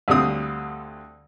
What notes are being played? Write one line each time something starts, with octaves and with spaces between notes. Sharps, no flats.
D2 D3 G3 C4 F4 D#6